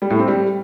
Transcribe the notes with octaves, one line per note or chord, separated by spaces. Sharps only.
G3
A2
C4
G3